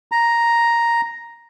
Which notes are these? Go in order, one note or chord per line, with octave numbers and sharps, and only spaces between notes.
A#5